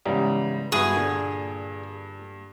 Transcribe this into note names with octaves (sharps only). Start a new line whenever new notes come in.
G#2 C#3 E3 G3 B3
G2 B3 E4 F#4 G#4
A#2 D3